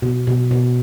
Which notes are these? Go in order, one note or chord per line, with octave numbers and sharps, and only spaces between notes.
B2
B2
B2